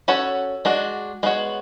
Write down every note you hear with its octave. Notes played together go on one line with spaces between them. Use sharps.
C#4 F#4 A4 C#5
G#3 D4 F#4
G#3 B3 F#4 C#5